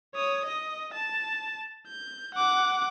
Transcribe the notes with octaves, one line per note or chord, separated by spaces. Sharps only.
C#5 D#6
D#5
A5
G6
F#5 D6